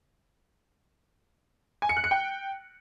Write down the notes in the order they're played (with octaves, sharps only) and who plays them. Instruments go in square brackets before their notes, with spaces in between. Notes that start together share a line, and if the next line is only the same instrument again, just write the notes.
[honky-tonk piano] G#5
C#7
F#6
C#7
G5